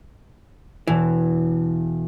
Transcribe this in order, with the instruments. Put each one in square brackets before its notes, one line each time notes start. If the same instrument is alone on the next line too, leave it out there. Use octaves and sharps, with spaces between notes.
[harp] E1 E7 [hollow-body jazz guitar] E3